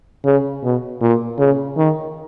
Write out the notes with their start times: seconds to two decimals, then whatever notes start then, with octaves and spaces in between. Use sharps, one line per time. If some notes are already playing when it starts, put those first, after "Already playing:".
0.25 C#3
0.63 B2
1.01 A#2
1.39 C#3
1.77 D#3